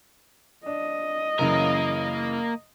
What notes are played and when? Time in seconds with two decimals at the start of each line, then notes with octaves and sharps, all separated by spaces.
0.66 D4 D#5
1.39 F#2 C#3 E3 A#3 A#4